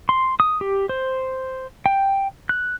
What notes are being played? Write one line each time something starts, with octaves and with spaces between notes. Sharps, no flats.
C6
D#6
G4
C5
G5
F#6